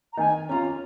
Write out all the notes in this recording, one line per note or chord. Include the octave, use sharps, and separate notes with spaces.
A#5
D#3 G#5
C#4 F4 A#5